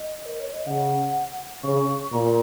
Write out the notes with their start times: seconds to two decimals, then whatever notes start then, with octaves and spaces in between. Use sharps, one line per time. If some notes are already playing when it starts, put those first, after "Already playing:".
Already playing: D#5
0.26 A#4
0.40 C#5
0.53 D#5
0.67 C#3 F#5
1.63 C#3 C#6
2.12 A#2 A#5